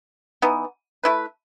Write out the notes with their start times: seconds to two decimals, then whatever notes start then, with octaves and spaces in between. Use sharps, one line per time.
0.42 E3 B3 D#4
1.04 A3 E4 B4